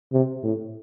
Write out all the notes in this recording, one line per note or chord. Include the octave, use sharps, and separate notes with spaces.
C3
A2